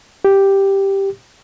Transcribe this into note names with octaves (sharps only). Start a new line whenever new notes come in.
G4